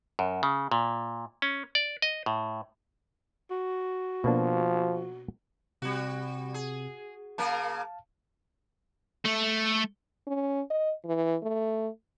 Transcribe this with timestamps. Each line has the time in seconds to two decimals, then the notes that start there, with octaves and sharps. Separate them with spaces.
0.19 F#2
0.43 C#3
0.72 A#2
1.42 C#4
1.75 D5
2.02 D#5
2.26 A2
3.50 F#4
4.24 B2 F3 A#3 D4
5.82 C3 G3 C4 F#4
6.54 G#4
7.38 C#3 A#3 A#4 F5 A5
9.25 A3
10.27 C#4
10.70 D#5
11.05 E3
11.43 A3